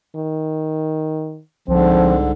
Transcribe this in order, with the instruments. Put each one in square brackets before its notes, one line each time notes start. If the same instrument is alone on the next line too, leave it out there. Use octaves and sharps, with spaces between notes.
[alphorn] D#3
[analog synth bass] C2 [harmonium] G#2 D3 [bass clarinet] F3 [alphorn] C4